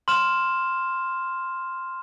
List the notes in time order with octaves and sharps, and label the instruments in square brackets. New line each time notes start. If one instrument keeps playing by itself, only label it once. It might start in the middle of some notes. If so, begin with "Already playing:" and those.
[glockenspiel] C6 F6 E7